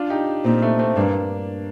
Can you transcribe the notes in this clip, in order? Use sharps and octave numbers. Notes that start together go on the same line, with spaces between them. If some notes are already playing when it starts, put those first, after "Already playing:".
Already playing: D4 F4
D#4 G4
A#2 C4 D#4
A3 C4
A3 C4
G2 A#3 D4